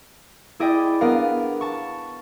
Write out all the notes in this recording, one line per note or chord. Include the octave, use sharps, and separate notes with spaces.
E4 G#4 D5 D#5 G5
B3 D4 A#4 F5
A5 C#6